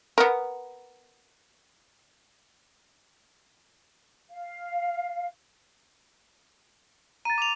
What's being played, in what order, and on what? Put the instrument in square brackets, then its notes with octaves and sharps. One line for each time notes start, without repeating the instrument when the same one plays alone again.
[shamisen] B3 A#4
[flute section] F5
[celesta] A#5 A6 [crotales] D#7
[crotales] D6 F7